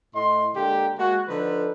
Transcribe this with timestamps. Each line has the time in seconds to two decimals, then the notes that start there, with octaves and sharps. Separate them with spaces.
0.15 A2 D#5 C6
0.54 D3 G#3 A#3 G4
0.98 G#3 A#3 F#4
1.28 D3 F3 D#4 A4 B4